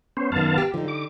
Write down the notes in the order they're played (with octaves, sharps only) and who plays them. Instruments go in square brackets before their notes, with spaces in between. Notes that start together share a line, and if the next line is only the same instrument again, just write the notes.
[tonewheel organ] B3 C#4 C5
[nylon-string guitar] F#2 D#3 [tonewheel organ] B3 F5 A5
[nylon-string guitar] G4
[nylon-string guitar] D3 D#4 [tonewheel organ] F3
[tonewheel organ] D6